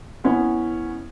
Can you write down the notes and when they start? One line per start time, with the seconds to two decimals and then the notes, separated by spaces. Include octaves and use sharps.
0.24 B3 C#4 E4